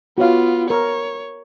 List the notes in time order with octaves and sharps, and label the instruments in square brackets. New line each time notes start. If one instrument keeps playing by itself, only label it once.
[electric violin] B3 F4 [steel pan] F#4 C#5 F5
[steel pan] A#4 [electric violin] C#5